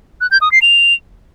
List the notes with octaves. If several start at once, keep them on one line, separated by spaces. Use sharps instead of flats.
F#6
G6
D#6
C7
F7